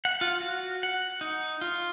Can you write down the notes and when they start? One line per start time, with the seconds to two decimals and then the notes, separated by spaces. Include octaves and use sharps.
0.05 F#5
0.21 F4
0.41 F#4
0.83 F#5
1.21 D#4
1.61 F4